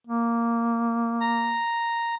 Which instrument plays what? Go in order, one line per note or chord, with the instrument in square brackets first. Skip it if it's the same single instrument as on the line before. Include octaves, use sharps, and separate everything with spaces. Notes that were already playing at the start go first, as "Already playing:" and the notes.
[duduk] A#3
[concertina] A#5